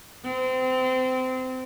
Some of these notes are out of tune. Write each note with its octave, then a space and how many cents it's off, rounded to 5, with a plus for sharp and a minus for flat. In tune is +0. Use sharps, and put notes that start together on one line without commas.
C4 -25